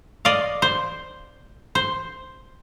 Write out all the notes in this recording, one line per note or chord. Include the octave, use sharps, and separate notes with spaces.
D5 D#5 F5
C5
C5